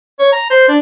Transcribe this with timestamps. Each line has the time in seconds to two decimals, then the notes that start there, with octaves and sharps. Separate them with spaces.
0.19 C#5
0.33 A#5
0.50 C5
0.68 D4